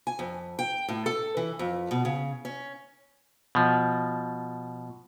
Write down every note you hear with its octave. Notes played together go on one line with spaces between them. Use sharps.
G#5
F2
G5
A2
A4
E3
F2
B2
C#3
C#4
B2 F3